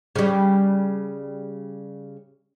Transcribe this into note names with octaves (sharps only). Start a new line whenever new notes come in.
C#3 G3